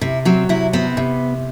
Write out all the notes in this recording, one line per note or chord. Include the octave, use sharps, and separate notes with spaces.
C3 E4
F#3 C4
C3 E4
B3 C4
C3